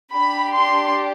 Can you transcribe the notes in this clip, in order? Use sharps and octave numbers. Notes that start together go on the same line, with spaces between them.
D4 G4 B5
C6